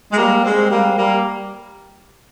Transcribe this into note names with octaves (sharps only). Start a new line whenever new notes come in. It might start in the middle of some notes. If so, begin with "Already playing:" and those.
G#3
G3 A#3
G#3 C4
G3 A#3
G3 A#3